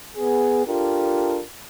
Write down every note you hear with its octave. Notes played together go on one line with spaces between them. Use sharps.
B3 G#4
D4 F4 G4 A4 A#4